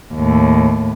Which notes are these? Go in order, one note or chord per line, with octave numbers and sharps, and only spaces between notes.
D#2 A2